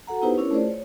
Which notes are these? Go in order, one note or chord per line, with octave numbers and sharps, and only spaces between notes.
F#4 A4 F#5 A#5
B3 D#4 E4 G4 B4 C5
C#4 D4 E4 A#4 C#5
A3 F4 G#4 C5 D5
C#5